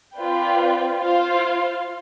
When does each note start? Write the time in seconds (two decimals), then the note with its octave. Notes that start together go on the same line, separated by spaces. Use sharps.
0.17 C4 F4 B4 D5 G5
1.00 F4 C5 F5